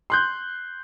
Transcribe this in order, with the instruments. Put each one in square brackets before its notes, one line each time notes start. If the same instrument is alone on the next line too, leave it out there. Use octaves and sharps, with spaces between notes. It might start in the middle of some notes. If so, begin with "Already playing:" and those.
[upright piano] C6 F#6 G6